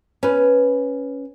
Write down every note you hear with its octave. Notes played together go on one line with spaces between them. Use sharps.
C#4 B4